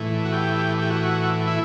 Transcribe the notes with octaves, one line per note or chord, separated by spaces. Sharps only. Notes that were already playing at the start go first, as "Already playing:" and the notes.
Already playing: A2 E3
F#4
G4
G4
F#4
E4